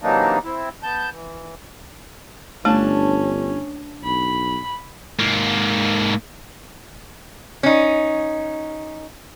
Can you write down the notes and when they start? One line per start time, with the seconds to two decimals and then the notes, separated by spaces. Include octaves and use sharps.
0.02 C3 E3 F#3 A#3 D4 D#4
0.44 C4 E4
0.83 B3 A5 G6
1.12 E3
2.65 G1 A3 C#4 D4 A5
4.04 B1 B5
5.20 G#2 A#3
7.63 C#4 D#4